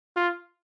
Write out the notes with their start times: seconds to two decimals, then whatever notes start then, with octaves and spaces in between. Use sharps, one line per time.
0.16 F4